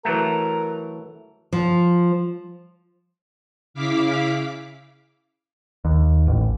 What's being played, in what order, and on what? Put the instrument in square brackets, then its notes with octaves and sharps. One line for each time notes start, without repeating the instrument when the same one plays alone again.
[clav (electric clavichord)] E3 F#3 A3 [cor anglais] A#4
[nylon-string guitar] F3
[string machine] C#3 E4 F5 D6 B6
[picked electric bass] D#2
A1